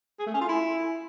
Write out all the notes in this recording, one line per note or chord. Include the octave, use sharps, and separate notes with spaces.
G#4
A3
C#4
F4
E4